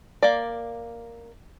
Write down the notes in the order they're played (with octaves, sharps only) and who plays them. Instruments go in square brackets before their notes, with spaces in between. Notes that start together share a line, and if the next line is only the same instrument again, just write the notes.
[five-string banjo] A#3 D5